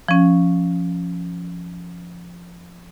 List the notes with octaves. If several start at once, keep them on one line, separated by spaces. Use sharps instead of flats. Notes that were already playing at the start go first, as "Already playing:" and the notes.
F3 C#4